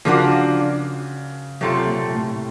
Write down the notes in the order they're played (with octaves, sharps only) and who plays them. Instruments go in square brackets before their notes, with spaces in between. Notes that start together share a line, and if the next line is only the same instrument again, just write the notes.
[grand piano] C#3 [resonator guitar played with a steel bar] F3 A#3 D4 F#4
[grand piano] C3 [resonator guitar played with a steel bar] F#3 A3 C4 F4 A4
[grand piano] A#2
A2